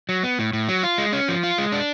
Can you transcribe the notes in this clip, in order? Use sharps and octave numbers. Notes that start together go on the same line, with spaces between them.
F#3
B3
A2
A2
F#3
F4
G#3
C#4
F3
F4
G#3
D4